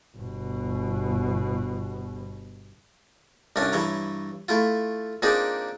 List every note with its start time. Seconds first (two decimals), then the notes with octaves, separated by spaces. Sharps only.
0.17 G1 B2
3.56 C2 G2 C#4 D4 C#5
3.72 G2 E3 C#5 A#5
4.49 A3 E4 F4
5.22 A#2 C4 D4 D#4 G#4